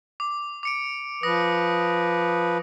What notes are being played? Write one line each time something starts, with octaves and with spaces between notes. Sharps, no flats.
D6
D6 C#7 D7
F3 B4 D#6 A#6